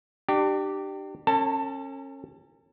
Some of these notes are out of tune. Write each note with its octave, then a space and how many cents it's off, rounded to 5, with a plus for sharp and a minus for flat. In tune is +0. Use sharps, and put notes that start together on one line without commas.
D4 +35 G4 -10
C#4 -30 A4 +45 A5 +15